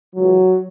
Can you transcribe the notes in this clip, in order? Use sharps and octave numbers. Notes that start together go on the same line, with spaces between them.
C#2 C#3 E3 F#3